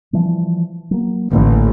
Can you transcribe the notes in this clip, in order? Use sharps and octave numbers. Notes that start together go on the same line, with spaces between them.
E3 F3 G3
F#3 A#3
A1 D3 A#3